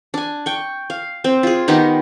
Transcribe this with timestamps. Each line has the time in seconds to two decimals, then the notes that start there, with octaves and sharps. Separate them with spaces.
0.14 D4 G#5
0.46 G5 C#6
0.90 F5
1.24 C4
1.43 F4 G#4
1.68 D#3 B3 D#4 G4